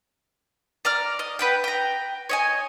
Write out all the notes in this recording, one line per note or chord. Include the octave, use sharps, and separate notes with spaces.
D5 A#5 F6
D#5
B4 F#5 G5
G5 A#5
C#5 D#5 G#5